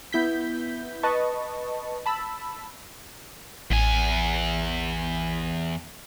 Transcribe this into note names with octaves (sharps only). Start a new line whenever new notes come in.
B3 E4 G6 B6
B4 D#5 A5 C#6
A5 B5 E6
A1 E2 G#5